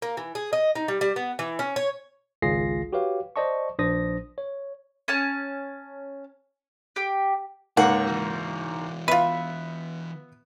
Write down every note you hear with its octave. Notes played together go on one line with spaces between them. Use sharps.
A#3
E3
G#4
D#5
D#4
G3
G3
B3
E3
C#4
C#5
G#1 C#2 F4 G#4 A#6 C7
F#4 G4 B4 C#5 F5
C5 D5 D#5 A5 C#6
A#1 D4 C5 D#6 A#6
C#5
C#4 A5
G4
C#2 G#2 A#3 C#5 F#5
E3 F#4
B3 F4 B4 E5